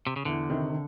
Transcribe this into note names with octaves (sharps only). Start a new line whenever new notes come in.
C3
C#3
E2 D3
C3 D#3